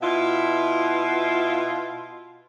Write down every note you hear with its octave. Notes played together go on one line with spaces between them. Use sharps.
B2 E4 F4